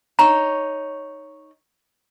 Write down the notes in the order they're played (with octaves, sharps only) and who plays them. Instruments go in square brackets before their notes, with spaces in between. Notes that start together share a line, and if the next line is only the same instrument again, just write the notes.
[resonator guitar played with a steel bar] D#4 C#5 [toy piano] A#5